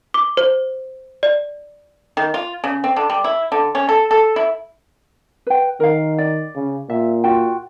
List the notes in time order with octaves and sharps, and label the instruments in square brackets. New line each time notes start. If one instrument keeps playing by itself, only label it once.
[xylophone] D6
C5
D5
[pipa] D#3
F4
C#3
C4
D3
G3
E4
D3
C#4
A4
A4
E4
[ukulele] B4 G5
[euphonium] D#3 [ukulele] A#4 F5
[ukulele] D5
[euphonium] C#3
[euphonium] A#2 [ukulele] E5
[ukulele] F4 F#4 G5